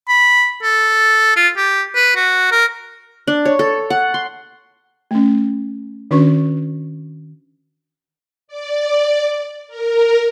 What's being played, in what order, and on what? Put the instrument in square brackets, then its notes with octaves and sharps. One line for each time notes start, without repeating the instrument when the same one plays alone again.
[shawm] B5
A4
F4
G4
B4
F#4
A#4
[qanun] D4
C#5
A4
F#5
C6
[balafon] A3 C#4
D#3 C#4 D4 F#4 B4 C#6
[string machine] D5
A#4